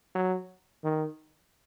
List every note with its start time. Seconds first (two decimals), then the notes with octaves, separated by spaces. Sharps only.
0.15 F#3
0.84 D#3